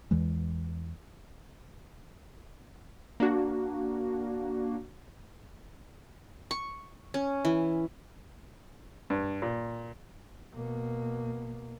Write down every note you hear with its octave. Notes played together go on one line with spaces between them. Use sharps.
E2 E3 G#3
A#3 D4 F#4
C#6
C#4
E3
G2
A#2
B2 A#3